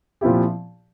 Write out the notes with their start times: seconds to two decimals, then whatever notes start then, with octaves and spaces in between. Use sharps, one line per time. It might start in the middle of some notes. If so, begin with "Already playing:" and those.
0.21 A#2 F3 C4 E4 G4